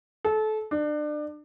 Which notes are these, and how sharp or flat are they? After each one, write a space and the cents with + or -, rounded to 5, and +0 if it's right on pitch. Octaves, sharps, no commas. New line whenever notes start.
A4 -25
D4 +30